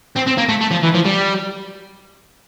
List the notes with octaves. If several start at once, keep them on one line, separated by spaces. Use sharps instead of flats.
C4
C4
A#3
A3
A3
F3
E3
F3
G3